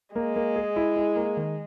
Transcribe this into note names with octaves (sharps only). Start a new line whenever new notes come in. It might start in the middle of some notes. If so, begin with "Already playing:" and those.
G#3 A#3
A#3
G#4
E4
E4
A#3
D#3